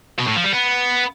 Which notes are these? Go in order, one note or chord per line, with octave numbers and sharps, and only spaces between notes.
B2
A2
F3
G3
B3